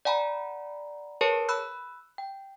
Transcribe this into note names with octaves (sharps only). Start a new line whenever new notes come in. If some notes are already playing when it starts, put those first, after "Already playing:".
D5 F#5 G#5 A#5 B5
G#4 A#4 B4 C#5 A5
B5 E6 F#6
G5